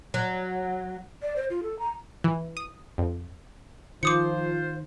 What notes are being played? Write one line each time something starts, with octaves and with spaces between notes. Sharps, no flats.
F#3
D5
C5
F4
A4
A#5
E3
D#6
F2
D#3 F3 F4 C5 D6 D#6 C#7